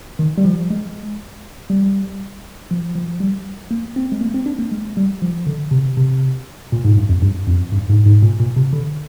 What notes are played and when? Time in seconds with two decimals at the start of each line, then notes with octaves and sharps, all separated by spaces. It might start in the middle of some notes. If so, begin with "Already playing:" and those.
0.19 D#3
0.38 G3
0.45 F3
0.71 G#3
1.70 G3
2.71 F3
2.95 F3
3.21 G3
3.71 A#3
3.96 C4
4.12 G#3
4.21 A#3
4.34 C4
4.46 D4
4.59 A#3
4.72 G#3
4.97 G3
5.22 F3
5.47 D3
5.71 C3
5.97 C3
6.72 A#2
6.85 G#2
6.97 G2
7.09 F2
7.22 G2
7.48 F2
7.73 G2
7.90 G#2
8.06 G#2
8.23 A#2
8.39 A#2
8.56 C3
8.73 D3